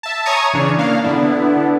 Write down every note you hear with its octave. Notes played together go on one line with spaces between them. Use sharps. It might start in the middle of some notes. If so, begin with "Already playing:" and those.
E5 A5
C#5 G#5 A#5 C#6 D#6
C#3 E3 D4 C#5
A#3 D4 F5
D3 B3 D4 E4